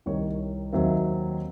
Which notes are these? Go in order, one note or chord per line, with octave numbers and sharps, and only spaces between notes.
C2 C3 D#3 C#5
D#2 D#3 F#3 C4 E5